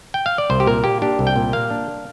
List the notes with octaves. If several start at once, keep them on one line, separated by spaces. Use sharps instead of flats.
G5
F5
D5
C2 C5
G4
A#2 A#4
A#3 G4
D4 G4
C2
G5
A#2
A#3 F5
D4